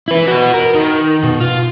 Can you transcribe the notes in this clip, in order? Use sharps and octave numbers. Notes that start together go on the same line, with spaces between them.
E4 B4
F#4 B4
A#4
D#3
B2
F4